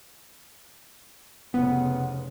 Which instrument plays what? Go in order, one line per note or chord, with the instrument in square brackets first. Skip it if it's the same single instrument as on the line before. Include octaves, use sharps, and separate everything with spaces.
[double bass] F1 C#3 [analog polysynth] B3